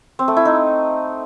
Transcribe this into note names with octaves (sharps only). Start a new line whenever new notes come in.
C4
A3
E4
D#4